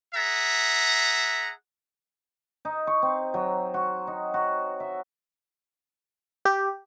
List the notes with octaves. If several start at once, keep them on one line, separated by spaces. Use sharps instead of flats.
G#4 E5 F#5 A#5
D#4
C#6
C4
F#3
F#4
D#4
F#4
E5
G4